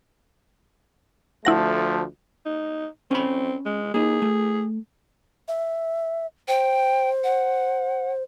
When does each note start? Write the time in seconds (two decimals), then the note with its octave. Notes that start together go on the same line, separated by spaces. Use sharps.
1.45 D2 F3 A3 E4 F#5 A#6
2.46 D#4
3.11 C4 C#4 B5
3.66 G#3
3.94 A#3 D#4 G#4
4.22 A3
5.48 E5
6.48 C5 G5
7.24 F#5